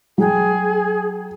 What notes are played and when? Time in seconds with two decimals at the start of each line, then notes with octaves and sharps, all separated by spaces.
0.18 F#3 G#4 G5